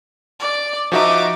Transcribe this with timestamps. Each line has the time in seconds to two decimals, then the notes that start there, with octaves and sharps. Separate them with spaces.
0.40 D5
0.92 F3 D#4 F#4 E5 D6